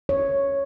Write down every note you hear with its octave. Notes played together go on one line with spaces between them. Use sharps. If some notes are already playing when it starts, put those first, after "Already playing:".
C#5